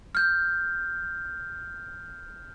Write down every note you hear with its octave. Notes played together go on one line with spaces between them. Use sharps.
F6 G6